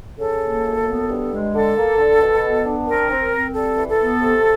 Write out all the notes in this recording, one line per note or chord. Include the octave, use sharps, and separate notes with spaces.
C#3 A4
A#3
F#2
B3
G2
G#3
D3 A4
A#3
D3
B2
B3
D4
C4 A#4
C4
C4
G3 A4
E3
A4
B3
C3